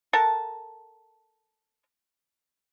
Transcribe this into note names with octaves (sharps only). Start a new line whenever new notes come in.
A4 A#4 F#5 A5